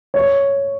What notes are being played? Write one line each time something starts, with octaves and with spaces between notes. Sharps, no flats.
C#5